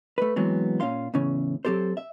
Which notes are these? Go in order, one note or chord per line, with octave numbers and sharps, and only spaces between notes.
A3 B4
E3 F#3 G#3 B3 C4
A#2 C#4 F4 F5 C6
E2 A2 C#3 C#4
F#3 C4 G4 A4 C5
E5